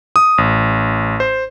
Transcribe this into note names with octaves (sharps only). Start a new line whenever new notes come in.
D#6
A1
C5